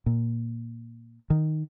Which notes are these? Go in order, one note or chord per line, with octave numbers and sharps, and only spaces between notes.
A#2
D#3